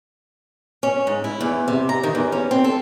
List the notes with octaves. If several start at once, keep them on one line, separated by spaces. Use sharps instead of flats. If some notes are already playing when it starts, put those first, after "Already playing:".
C#4
G#2
E4
E2
C3
A#5
D#3
E2
C#4
C4
A4